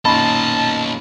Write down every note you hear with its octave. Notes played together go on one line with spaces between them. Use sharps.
B1 F#2 A#2 D#3 D#5 A5 B5